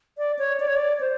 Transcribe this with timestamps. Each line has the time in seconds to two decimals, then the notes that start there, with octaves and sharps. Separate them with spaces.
0.18 D5
0.39 C#5
0.60 D5
0.67 C#5
0.76 D5
1.00 C5